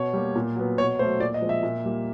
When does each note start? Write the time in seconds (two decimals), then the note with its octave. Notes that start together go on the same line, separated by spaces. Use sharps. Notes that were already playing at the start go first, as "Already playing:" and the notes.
Already playing: B2 C#5
0.13 G3 A#3
0.36 A#2
0.56 F#3 B3
0.78 B2 C#5
0.99 A3 C5
1.04 F#3
1.20 A#2 D5
1.34 D#5
1.41 F3 G#3 C4
1.49 E5
1.63 A#2
1.85 G3 A#3